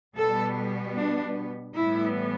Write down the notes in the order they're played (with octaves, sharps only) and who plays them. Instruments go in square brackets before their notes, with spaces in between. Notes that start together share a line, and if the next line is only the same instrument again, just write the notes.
[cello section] B2 G3 B3 A4
D4
A2 E3 G3 B3 E4